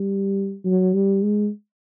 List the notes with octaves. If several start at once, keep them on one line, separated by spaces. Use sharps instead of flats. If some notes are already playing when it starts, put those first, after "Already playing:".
Already playing: G3
F#3
G3
G#3